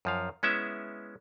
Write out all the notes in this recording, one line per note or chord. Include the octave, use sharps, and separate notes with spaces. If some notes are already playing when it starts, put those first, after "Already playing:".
F#2 F3 F5
G#3 B3 C#4 E4 E5